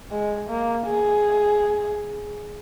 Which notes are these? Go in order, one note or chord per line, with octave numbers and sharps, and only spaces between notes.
G#3
A#3
G#4